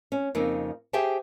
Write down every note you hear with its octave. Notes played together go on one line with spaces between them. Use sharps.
C#4
F2 C#3 A#3 C4 D#4
G4 G#4 C5 E5 G5 A5